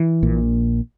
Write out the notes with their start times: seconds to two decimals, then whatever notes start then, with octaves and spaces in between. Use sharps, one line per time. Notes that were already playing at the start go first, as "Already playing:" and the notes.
Already playing: E3
0.23 A#1 A#2